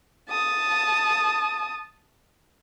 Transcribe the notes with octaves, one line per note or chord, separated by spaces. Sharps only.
A5 D#6